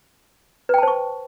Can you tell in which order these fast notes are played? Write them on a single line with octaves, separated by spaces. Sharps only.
B4 G5 A5 C5 C#6